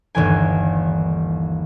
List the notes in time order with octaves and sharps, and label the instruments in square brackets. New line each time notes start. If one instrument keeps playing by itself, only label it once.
[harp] G1 D#2 E3 G#5